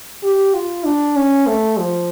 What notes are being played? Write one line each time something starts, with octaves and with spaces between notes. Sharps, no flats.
G4
F4
D4
C#4
A3
F3